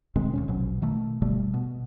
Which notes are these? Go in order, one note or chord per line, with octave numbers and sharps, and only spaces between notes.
B2 D#3 G#3 C4
D#2 B2 C#4
A#1 B2 F#3
B2 D#3 A3
G1 B2 G3 A3
B2